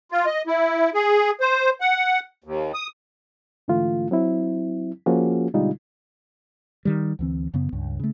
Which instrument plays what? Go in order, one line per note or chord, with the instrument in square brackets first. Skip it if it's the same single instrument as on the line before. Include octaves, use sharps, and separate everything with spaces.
[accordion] F4
D#5
E4
G#4
C5
F#5
D#2
D#6
[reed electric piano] G#2 D3 E3 A3 F4
F#3 C4 E4
F3 A#3 C#4 F4 F#4 G#4
B2 D3 G3 G#3 D#4 F4
[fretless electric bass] D#3 G3
D2 E3 C4
F#2 C#3 B3
C#2 G2
C#3 A3